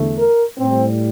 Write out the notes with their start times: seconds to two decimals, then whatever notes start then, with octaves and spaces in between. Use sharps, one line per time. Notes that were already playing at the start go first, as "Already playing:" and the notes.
Already playing: E2 D3 A3
0.18 A#4
0.57 A2 G3 C4